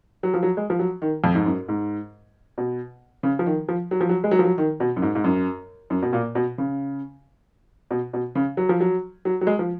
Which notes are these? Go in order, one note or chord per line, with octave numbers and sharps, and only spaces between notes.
F#3
F3
F#3
G#3
F3
F#3
D#3
F2
G#2
F#2
G#2
B2
C#3
F3
D#3
F3
F#3
F3
F#3
G#3
F#3
F3
F#3
D#3
B2
F#2
G#2
G#2
F#2
F#2
B2
A#2
B2
C#3
B2
B2
C#3
F#3
F3
F#3
F#3
F#3
G#3
F3